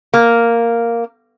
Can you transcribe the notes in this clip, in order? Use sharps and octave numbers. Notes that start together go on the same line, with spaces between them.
A#3